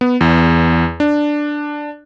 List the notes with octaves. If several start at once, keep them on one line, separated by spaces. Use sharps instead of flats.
B3
E2
D4